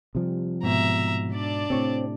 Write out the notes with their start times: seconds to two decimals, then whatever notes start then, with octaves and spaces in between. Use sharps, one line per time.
0.15 C3 F3 G3
0.63 G#2 B2 E5 A#5
1.32 D4 D5
1.70 A2 C3 C4 C#5